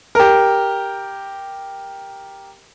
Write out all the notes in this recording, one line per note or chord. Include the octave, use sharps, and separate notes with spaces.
G4 A#4